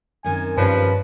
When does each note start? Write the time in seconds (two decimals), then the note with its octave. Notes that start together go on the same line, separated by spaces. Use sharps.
0.24 F#2 D#3 C4 G#5
0.57 G2 F3 G3 C#4 B4